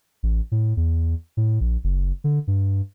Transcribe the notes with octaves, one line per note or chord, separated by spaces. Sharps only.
A1
A2
E2
A2
A#1
F#1
D3
G2